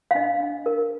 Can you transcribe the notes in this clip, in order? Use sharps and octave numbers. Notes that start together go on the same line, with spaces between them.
F5
D4 D#5
D4
A#4